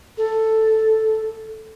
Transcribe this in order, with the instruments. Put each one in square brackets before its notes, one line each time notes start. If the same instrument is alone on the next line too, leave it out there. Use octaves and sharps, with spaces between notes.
[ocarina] A4